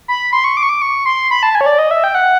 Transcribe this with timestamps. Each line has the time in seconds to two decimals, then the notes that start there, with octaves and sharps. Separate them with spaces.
0.08 B5
0.33 C6
0.44 C#6
0.57 D6
0.63 C#6
0.69 D6
0.82 C#6
1.06 C6
1.31 B5
1.43 A5
1.55 G#5
1.61 C#5
1.66 D5
1.79 D#5
1.91 E5
2.04 G5
2.15 F#5